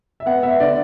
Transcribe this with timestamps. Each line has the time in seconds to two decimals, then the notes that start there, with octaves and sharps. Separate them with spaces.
0.20 E5
0.26 B3 F#5
0.43 B3 E5
0.60 D3 D5